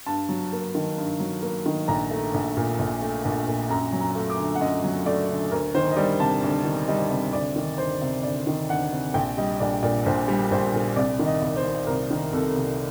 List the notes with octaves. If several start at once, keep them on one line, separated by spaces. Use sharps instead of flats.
G2 A5
F#3
A#3
D#3
G2
F#3
A#3
D#3
A#1 A#5
A3
A#1
A#2
A#1
A3
A#1
A#2
F#2 A#5
F#3
A#5
A3
D6
D3
F#5
F#2 D#5
F#3
A3 D5
D3
D2 A#4
D#3 C5
D#5
G3 D5
C3 A5
D2
D#3
G3 D#5
C3
D2 D5
D#3
D2 C5
C3
D2 D5
D#3
D2 F#5
C3
A#1 G5
G3 D#5
A#1 D5
A#2 D5
A#1 C5
G3
A#1 C5
A#2
C2 D5
D#3
D#5
C2
C5
C3
C2 A#4
D#3
C2 A4
C3